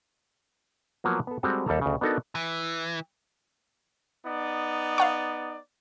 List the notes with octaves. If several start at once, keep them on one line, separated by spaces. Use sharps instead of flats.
F3 F#3 A#3 B3 F#5 A#5
B3 A4
G3 G#3 C4 F#4 A4
D#2 G3 A4 A#5
D2 C#3
B3 D4 D#4 F#4 A4 A#4
E3
B3 D#4 D5
F5 F#5 C#6